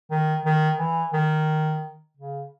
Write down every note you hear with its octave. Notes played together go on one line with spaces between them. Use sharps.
D#3
D#3
E3
D#3
C#3